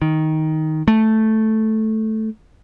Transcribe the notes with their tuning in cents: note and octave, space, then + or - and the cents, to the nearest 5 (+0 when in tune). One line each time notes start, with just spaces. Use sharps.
D#3 +10
A3 -5